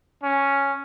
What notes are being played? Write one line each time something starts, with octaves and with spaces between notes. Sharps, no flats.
C#4